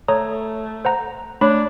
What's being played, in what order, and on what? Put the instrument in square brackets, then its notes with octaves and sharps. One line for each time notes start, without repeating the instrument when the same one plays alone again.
[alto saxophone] A3 [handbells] C#5 A#5 D#6
[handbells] C5 F#5 A#5
[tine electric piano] A3 [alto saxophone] D4 [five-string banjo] C#5 [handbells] B5